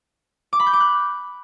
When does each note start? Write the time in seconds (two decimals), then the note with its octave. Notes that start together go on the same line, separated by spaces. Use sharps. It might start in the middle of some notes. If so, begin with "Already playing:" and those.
0.53 D6
0.60 B5
0.67 G6
0.73 D6
0.80 F#6